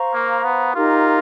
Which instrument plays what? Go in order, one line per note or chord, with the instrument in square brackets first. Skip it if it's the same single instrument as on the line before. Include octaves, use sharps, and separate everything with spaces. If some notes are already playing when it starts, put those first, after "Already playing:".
Already playing: [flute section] C5 F5 A#5 C#6
[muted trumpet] A#3
B3
[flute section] D#4 G4 A#4 [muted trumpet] F4